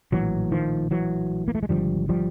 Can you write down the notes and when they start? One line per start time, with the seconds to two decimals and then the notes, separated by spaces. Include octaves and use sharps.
0.12 A#1 A2 E3 F#3
0.52 D#3 F3
0.91 E3 F#3
1.48 A#3
1.55 A3
1.63 G#3
1.69 G#1 G2 D3 F3 G3
2.09 F3 G3